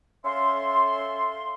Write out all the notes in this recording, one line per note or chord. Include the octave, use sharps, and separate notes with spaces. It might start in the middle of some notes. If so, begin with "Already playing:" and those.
C#4 A4 E5 F5 C6